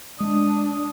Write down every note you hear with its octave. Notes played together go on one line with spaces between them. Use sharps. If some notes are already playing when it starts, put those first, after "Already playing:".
G#3 D4 D#6